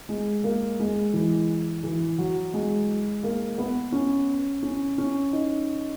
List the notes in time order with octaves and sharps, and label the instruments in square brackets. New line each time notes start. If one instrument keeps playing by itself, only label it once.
[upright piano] G#3
A#3
G#3
E3
E3
F#3
G#3
A#3
B3
C#4
C#4
C#4
D#4